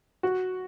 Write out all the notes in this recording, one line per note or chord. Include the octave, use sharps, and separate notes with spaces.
F#4